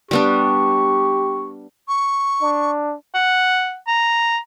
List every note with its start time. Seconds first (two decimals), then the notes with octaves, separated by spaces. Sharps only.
0.11 G3 B3 D4 G4 C#6
1.88 C#6
2.42 D4
3.14 F#5
3.88 A#5